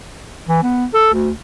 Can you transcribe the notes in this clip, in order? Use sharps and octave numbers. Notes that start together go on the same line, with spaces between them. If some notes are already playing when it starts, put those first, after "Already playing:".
E3
B3
A4
D2